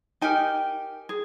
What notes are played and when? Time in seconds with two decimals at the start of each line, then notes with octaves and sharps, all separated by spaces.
0.21 D#4 G4 A#4 G#5
1.09 G#4